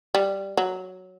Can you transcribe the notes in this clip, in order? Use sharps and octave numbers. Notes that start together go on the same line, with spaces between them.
G3
F#3